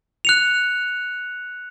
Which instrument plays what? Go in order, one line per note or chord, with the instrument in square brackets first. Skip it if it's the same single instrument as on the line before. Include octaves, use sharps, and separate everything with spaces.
[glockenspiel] F#6 C#7 F7